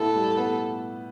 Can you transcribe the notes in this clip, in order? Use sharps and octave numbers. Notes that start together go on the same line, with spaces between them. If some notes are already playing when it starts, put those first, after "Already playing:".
Already playing: A2 B3 E4 A4
G3
B3